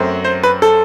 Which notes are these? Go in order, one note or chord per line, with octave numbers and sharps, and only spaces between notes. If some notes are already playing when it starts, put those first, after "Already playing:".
Already playing: F#2 F#3 A3 C4
C5
B4
A4